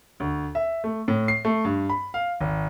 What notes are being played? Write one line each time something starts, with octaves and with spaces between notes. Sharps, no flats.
D2
E5
A3
A2
C7
A3
G2
B5
F5
G#1